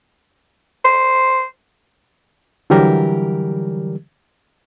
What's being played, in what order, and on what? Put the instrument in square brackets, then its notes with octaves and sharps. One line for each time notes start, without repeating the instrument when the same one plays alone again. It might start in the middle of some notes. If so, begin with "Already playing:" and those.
[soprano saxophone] C5
[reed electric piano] D3 E3 F#3 G3 G4 A#4